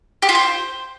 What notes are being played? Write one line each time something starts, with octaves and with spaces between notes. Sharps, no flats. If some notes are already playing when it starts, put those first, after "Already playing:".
G4
F4
C5